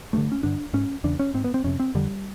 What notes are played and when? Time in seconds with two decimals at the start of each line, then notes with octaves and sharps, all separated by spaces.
0.13 G2 D3 A3
0.32 C#4
0.43 G2 D3 D4
0.73 G#2 C#4
1.04 E2 C#3 D4
1.19 C#4
1.34 G#2 C4
1.44 B3
1.54 C4
1.64 F2 C3 C#4
1.80 C4
1.95 F2 D3 G3